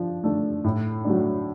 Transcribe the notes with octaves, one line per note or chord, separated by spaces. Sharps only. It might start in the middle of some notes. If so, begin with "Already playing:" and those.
Already playing: F3 D4
A3 D4
A2
F#3 A3 D4